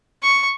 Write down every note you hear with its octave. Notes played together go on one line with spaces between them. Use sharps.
C#6